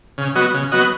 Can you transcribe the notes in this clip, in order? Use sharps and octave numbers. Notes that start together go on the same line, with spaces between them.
C#3
F#3 B3 F#4 D#5
C#3
F#3 B3 F#4 D#5